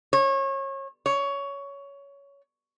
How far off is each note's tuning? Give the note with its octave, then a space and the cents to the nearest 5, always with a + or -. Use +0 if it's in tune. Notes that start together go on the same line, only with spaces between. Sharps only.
C#5 -30
C#5 +15